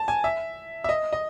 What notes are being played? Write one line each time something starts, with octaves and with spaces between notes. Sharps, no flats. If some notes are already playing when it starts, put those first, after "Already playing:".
Already playing: A5
G#5
E5
E5
D#5
D#5